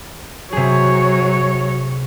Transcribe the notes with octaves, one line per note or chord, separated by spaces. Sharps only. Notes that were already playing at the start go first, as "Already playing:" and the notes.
C3 F#3 G#4 C#5